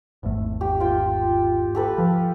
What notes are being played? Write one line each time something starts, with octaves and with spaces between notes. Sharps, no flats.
G#1 E2 A3
G4
F4 G5
G4 A4 B4
F3